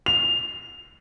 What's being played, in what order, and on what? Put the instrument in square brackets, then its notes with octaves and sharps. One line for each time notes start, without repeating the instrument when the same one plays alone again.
[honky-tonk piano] F7